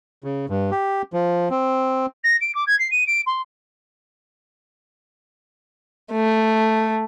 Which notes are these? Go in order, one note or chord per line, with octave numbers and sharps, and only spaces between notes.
C#3
G2
G4
F3
C4
A#6
D7
D6
G#6
C7
D#7
D7
C6
A3